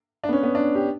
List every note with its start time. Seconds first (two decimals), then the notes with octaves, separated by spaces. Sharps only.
0.24 D4
0.29 B3
0.33 C#4
0.43 B3
0.55 D4
0.75 G4